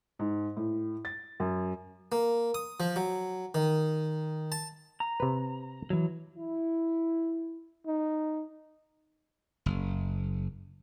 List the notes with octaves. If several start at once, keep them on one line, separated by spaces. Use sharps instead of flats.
G#2
A2
A6
F#2
A#3
D#6
F3
F#3
D#3
A5
A#5
C3 B4
E3 F#3
E4
D#4
F#1